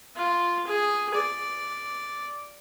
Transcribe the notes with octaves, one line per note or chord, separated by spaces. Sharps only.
F4
G#4
D5